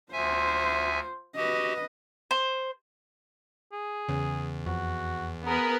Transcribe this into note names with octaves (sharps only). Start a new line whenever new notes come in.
D2 F4 C5 E5 G#5
F#4 G4 B4 D#5
C5
G#4
E2 C#3
F2 F#4
B3 G#4 A#4 B4